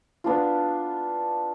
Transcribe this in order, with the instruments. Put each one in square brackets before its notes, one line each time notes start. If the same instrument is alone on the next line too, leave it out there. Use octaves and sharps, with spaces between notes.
[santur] B3 D4 F4